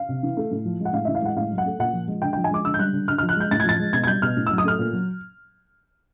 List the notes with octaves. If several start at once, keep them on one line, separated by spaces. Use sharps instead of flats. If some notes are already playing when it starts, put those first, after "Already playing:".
Already playing: F5
C3
E3
A3
A2
F3
G#3
F#5
A2 F5
E3 E5
F5
G#3 F#5
A2 F5
F#3
F#5
A3
A#2 F#5
F3
G#3
D3 G5
F3 G5
G#5
G#3 D6
D3 E6
G6
G3 F#6
D3
D3 F6
F3 F6
F#6
G#3 G6
A2 A6
G#6
F3 A6
G#3
B2 G#6
G#6
G3 G6
B2 F6
A2
F#3 E6
D#6
A3 F6
A#2
F#3